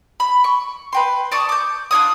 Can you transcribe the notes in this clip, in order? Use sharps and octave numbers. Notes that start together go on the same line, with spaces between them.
B5
C#6
B4 G5 C6
D5 A5 C#6 D#6
D6 G6
D4 F4 C#5 D#6